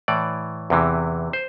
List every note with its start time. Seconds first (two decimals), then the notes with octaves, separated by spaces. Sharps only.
0.08 A2 E3 D5
0.70 E2 C3 E3
1.33 C5